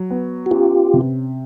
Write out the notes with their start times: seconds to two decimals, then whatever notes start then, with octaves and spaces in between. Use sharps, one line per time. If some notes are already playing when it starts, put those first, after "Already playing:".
Already playing: F#3
0.10 B3
0.46 F#4
0.51 C#4 F4 G4
0.93 C3